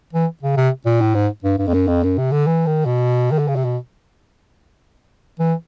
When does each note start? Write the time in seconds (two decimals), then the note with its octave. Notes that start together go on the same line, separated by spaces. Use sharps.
0.13 E3
0.43 C#3
0.57 C3
0.85 A#2
1.01 A2
1.15 G#2
1.44 G2
1.58 G2
1.67 F2
1.74 F#2
1.88 F2
2.03 F#2
2.18 C3
2.31 D3
2.47 E3
2.67 D#3
2.86 B2
3.32 D#3
3.39 D3
3.48 C#3
3.56 C3
3.64 B2
5.39 E3